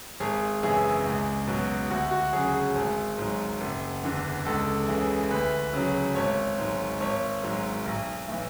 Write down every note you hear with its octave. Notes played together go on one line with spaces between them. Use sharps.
G#1 G#4
F#2 C#3 E3 G#4
C#2
B2 F#3
D2 F#4
F#4
C#3 F#3 G#4
G#4
G#1
G#2 F#3
F#1
E2 D3
C#2 A4
C#3 E3
D2 B4
C#3 F#3
G#1 C#5
G#2 F#3
G#1 C#5
G#2 F#3
B1
A2 E3